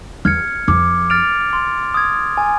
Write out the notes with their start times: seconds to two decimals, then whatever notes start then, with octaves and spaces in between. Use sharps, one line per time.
0.25 E2 F6 G#6 C#7
0.68 F2 D6
1.10 F6 A6 D7 F7
1.53 C6
1.94 D#6 G#6
2.37 G#5